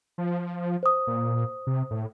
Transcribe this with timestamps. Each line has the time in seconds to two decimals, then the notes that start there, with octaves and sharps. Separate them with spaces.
0.18 F3
0.83 C5 D#6
1.07 A#2
1.67 C3
1.91 A2